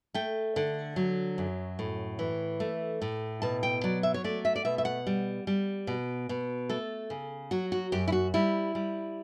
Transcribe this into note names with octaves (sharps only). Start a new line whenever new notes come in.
A3 G5
D3
F#3
F#2
A2
E3
A3
A2
B2 A5
G5
F#3 D5
E5
C#5
A3 D5
E5
D5
B2 E5
E5
F#5
G3
G3
B2
B2
A3 A4
C#3
F#3 F#4
F#4
F#2 G4
E4
F#4
G3 E4
G3